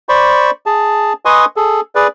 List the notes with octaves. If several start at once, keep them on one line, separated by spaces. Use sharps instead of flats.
C5 D5 B5 C#6
G#4 A5
B4 D#5 G#5 C6 C#6 D#6
G#4 A4
G#4 B4 D5